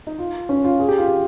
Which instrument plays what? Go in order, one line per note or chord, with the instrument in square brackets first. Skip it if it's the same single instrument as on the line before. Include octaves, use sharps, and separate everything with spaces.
[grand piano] D#4
F4
C#4
F4
G#4
G4
F4
G4